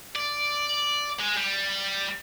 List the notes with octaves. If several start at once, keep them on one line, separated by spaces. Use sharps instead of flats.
D5
G#3
G3